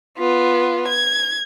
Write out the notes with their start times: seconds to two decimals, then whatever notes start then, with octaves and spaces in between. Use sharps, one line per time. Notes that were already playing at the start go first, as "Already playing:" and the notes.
0.18 B3 F4
0.88 G#6